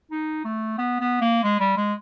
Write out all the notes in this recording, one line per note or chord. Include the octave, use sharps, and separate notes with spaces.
D#4
A3
B3
B3
A#3
G#3
G3
G#3